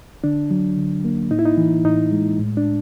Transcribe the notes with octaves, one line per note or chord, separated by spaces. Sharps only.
D3 D4
F#3
D3
A#3
A2 D#4
E4
D#4
E3
A2 D#4
G#3
A2
D4